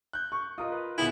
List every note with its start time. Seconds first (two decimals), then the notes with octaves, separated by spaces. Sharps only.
0.13 F#6 G6
0.32 C#6
0.58 F4 A#4 D#5 D#6
0.72 B4
0.98 D#1 B3 E4 G#4